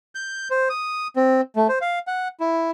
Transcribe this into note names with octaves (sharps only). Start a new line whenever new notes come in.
G6
C5
D#6
C4
A3
C5
F5
F#5
E4